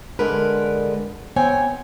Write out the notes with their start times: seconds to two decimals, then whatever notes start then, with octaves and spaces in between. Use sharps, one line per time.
0.19 D3 G#3 D4 A#4 B4
1.36 B3 C4 C#5 G5 G#5